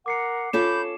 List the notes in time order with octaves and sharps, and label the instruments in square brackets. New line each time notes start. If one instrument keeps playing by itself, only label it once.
[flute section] A#4 F#5 [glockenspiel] D6 C7 C#7
[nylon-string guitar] C#4 F4 A4 [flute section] B5 D6 G6 [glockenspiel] E7